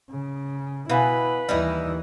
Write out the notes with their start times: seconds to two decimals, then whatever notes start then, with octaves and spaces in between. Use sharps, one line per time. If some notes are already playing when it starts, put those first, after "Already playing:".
0.11 C#3
0.89 B2 E4 B4 F5 G#5
1.49 D#2 E3 G3 D#4 E4